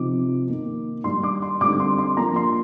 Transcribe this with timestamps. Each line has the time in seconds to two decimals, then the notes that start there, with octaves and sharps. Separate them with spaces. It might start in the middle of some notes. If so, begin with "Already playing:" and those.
Already playing: C3 F3 C4 D#4 D6
0.48 D#3 A#3 D#4
1.04 D#3 G3 D4 C6
1.23 D6
1.42 C6
1.61 D3 G3 C4 D#4 D6
1.80 C6
1.99 C6
2.17 F3 A#3 D4 A#5
2.36 C6